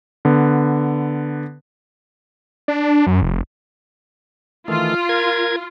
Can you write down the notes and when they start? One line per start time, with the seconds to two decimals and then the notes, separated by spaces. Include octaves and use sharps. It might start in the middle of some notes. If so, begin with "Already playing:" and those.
0.25 D3 B3
2.68 D4
3.07 F#2
3.22 F1
4.68 D#3 E3 A3 F4
5.09 A#4 G#6